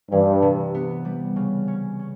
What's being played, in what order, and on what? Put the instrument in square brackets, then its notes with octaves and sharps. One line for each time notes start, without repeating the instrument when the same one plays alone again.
[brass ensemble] G2 [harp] E3
[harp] C3
B3
G3
C#3
C#4
C#4